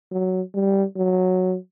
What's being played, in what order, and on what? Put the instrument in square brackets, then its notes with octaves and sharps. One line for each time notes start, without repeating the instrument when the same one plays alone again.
[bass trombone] F#3
G3
F#3